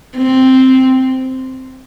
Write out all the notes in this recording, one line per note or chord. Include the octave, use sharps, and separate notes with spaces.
C4